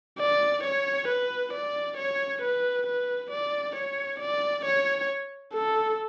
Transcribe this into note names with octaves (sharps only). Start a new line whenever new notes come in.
D5
C#5
B4
D5
C#5
B4
B4
D5
C#5
D5
C#5
A4